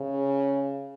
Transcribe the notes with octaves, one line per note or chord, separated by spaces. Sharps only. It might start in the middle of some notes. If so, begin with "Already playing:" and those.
Already playing: C#3